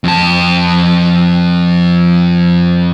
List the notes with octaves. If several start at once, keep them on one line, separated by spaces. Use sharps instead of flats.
F2 A5